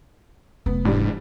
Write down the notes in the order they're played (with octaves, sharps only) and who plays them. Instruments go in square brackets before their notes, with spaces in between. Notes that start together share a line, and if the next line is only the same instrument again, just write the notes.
[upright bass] F1 [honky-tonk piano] B3
[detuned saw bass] G#2 [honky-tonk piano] E3 G3 D4